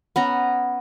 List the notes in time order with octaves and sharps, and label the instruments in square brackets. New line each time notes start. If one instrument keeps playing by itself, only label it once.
[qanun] B3 C#4 A#5